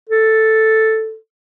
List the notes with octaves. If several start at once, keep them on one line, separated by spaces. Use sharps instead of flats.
A4